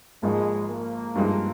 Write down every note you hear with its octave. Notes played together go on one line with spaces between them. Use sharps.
G#1 G#2 F3 G#3 A#3
A#3
G2 F3 G#3 D#4